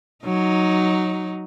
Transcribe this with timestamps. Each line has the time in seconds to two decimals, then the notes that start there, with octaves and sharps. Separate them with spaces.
0.25 F#3 D#4